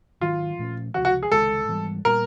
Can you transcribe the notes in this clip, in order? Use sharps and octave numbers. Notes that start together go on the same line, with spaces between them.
G#2 D#3 F#3 F4
A#2 F3 A3 C#4
C#2 C3 F3 F#4
F#4
G#4
C#2 C3 D#3 G#3 A4
G#2 E3 G3 B3
A#2 G3 B3 A#4